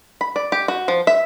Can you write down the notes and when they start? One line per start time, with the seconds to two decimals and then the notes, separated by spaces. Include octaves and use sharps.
0.21 B5
0.36 D5
0.52 G4
0.68 F#4
0.88 F3
1.07 E5